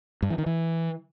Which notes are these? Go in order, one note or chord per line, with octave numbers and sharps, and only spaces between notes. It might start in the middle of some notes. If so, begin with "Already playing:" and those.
G2
E3
D#3
E3